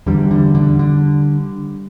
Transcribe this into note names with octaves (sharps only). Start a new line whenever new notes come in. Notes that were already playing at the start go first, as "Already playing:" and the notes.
E2 D3 G3
D3
D3
D3